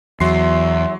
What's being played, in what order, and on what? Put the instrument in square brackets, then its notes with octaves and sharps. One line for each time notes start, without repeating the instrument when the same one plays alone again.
[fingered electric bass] E2 [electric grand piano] F#3 C6 C7 [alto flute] E5